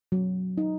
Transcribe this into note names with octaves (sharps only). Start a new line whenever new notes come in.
F#3
D#4